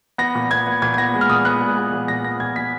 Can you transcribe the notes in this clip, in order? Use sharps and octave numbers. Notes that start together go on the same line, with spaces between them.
B3 A#6
A#2
B3 G#6
B3
A#2 G#6
G#6
B3 A#6
G#3
F6
A#2 D#6
B3 F#6
G#3
B3
A#2
A#2 A#6
B3 A#6
A#2 G#6
A#2 B6